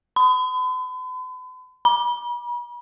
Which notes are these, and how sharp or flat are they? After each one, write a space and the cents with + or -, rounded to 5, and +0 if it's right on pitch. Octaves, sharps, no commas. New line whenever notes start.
B5 +45
B5 -40